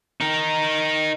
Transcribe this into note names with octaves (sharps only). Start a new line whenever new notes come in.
D#4 A#4